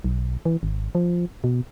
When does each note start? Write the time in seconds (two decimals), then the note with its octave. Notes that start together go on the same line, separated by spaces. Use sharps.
0.04 B1
0.45 E3
0.63 G#1
0.95 F3
1.44 B2